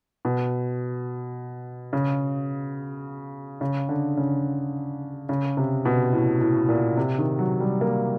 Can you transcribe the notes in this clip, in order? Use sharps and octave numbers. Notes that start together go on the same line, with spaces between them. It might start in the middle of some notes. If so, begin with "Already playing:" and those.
B2
C#3
C#3
D3
C#3
C#3
C3
B2
A2
A2
A#2
C3
D#3
F#3
G3
A#3